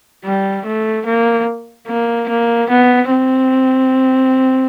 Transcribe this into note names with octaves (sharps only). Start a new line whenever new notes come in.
G3
A3
A#3
A#3
A#3
B3
C4